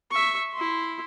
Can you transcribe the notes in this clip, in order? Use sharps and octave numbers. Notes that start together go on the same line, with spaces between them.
E5 C#6
E4 C6